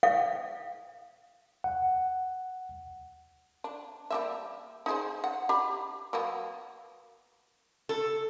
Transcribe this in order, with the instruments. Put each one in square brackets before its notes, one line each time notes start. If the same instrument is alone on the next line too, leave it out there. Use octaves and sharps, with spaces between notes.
[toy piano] F5
[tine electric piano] F#5
[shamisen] D4
G3 A#3 E5
D#4 G#4 C5
F#5
G4 F5 B5
F#3 A#3 B3
[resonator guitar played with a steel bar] A4